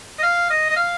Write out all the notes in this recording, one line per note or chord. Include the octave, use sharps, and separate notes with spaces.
D#5
F5
D#5
D#5
F5